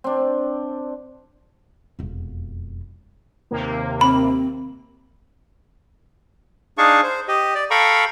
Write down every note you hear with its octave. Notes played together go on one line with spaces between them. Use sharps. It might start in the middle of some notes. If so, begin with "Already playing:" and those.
C4 D4
E1 F2
D#2 C3 A#3
C4 B5
D4 D#4 G#4 F5 A5 C#6
C5
G4 D#5
D5
A4 F5 G5 A#5 B5 C#6